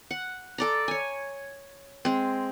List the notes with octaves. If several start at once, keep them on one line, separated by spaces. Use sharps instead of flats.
F#5
A4 D5 A#5
C#5 G#5
G#3 C4